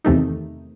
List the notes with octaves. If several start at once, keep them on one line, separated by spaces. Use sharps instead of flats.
E2 C3 D#3 A3 D#4